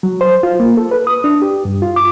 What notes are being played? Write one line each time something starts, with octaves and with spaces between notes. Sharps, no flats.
F#3
C5
F4
A#3
A4
B4
D#6
D4
G4
G2
F4
D6